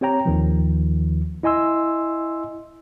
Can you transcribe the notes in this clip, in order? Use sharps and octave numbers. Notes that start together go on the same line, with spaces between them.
C4 G4 C#5 G5 A#5
D#2 D#3 F3
E4 D#5 G#5 C6 E6